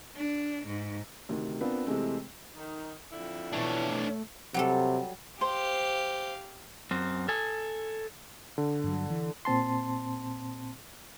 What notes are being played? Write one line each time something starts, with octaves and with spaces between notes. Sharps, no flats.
D4
G#2
D2 C3 D#3
B3 C4 D4 F4 A#4
C3 E3 G#3 A3 C4
D#3 D#4
F2 D3 E4
B2 E3 D4 C#5
A3
C3 F#3 G3 A4
G4 C5 F5
F#2 C4
A4 G#5
D3
G2 F#3
E3
A#2 C4 A5 C6